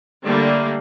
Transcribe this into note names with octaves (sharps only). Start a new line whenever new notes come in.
D3 G3 A3 A#3